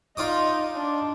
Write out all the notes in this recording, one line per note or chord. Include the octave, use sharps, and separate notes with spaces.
D#4 F4 D5 D#6
D4